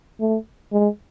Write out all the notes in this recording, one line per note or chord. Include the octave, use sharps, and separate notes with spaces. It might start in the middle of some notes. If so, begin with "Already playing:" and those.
A3
G#3